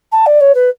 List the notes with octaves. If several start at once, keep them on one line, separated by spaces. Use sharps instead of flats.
A5
D5
C#5
B4